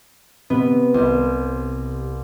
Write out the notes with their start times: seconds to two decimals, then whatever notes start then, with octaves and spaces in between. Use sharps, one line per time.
0.50 C3 B3
0.94 C2